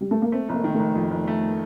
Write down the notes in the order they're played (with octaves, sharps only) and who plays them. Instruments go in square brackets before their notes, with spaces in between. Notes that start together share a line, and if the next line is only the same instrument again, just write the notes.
[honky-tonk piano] G3
A3
A#3
[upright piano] A3 [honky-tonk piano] C4
[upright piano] F1 [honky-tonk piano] A#3
[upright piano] D#3
[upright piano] F1 [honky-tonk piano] A3
[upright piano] F2
F1
A3